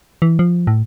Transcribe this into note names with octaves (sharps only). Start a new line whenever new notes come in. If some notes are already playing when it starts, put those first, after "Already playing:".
E3
F3
A2